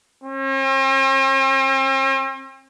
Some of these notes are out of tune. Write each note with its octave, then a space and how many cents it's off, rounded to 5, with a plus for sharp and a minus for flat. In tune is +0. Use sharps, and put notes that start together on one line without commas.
C4 +45